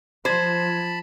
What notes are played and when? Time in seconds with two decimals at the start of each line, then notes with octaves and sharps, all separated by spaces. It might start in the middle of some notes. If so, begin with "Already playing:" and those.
0.25 F3 C5 A5 B5 C6 G#6